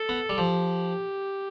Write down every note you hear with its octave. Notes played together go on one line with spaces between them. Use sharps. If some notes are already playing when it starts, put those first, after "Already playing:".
Already playing: A4
B3
G3
F3 G4